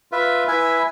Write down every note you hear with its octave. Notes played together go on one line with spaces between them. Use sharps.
F4 B4 E5
E4 B4 E5 G#5